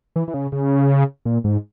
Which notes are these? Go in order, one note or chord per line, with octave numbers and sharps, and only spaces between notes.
E3
E3
C#3
C#3
A#2
G#2